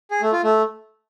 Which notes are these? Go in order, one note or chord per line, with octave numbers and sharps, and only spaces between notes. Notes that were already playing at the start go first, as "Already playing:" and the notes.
G#4
A3
F4
A3